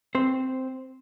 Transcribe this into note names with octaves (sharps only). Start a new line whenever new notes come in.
C4 C5